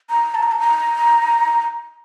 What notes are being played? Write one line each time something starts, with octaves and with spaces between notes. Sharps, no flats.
A#5
A5
A#5
A5
A#5